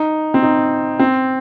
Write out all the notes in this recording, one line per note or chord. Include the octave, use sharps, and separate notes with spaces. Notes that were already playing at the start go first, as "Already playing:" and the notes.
Already playing: D#4
C4
D#4
C4